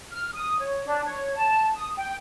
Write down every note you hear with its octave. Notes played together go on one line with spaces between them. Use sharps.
F6
D#6
C#5
D4
C#5
A5
D#6
G5